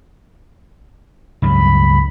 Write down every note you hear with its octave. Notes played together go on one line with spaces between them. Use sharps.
C#2 G2 F#3 B5